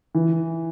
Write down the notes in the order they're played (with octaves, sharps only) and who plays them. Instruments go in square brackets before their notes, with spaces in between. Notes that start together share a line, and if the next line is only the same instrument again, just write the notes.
[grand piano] E3